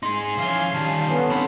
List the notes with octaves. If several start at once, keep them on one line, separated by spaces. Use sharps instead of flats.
D#4 G#4 C6
E3 F3 C#4 F5 G#5 C7 G7
D#3 G3 A5
D3 B3 C#4
C4 B5